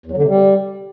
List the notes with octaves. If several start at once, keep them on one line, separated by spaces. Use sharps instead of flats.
E2
F#3
D3
C3
G3